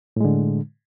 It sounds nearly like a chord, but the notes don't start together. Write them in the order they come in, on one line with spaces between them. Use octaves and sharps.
A2 G#3 D3